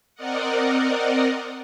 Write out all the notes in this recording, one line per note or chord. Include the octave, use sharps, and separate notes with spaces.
C4 A#4 D5 D#5 F#5